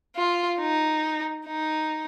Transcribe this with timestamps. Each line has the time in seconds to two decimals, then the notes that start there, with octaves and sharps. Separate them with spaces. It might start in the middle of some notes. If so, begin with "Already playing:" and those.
0.16 F4
0.60 D#4
1.47 D#4